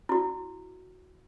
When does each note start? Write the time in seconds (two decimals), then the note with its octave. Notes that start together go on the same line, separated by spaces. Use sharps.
0.09 E4 F#4